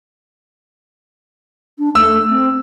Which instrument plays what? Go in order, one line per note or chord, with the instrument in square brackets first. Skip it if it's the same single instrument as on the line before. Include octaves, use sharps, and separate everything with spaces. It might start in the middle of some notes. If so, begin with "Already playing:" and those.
[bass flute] D4
[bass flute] A3 [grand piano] E6
[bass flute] C4